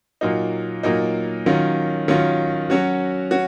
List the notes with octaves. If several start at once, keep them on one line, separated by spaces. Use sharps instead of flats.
A#2 F#3 A#3 D#4
A#2 F#3 A#3 D#4
D#3 F#3 C#4 F4
D#3 F#3 C#4 F4
F#3 C#4 F#4
C#4 F#4